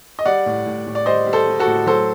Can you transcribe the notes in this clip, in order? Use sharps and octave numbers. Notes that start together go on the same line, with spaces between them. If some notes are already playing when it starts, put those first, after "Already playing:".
D#5
G3 D5 F#5
A2
A2
A2
D5
G3 C5 D#5
G3
A4 C5
G3
F#4 A4
A2
F#3 A4 C5